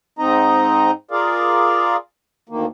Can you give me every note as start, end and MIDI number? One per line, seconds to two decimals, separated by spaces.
0.19 0.91 44
0.19 0.91 60
0.19 0.91 63
0.19 0.91 75
0.19 0.91 82
1.11 1.96 65
1.11 1.96 68
1.11 1.96 70
1.11 1.96 74
1.11 1.96 77
2.49 2.66 38
2.49 2.66 51
2.49 2.66 58